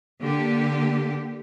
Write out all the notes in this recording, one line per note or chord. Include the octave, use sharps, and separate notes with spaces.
D3 A#3 G4